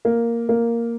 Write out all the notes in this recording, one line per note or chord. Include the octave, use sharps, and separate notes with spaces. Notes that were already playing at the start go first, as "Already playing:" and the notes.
A#3
A#3